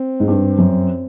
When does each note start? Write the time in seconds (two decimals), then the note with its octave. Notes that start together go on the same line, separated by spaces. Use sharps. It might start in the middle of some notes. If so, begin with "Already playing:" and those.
Already playing: C4
0.20 G#2
0.28 G2
0.58 F#2